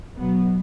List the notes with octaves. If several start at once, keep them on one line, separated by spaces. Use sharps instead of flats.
B2 F#3 B3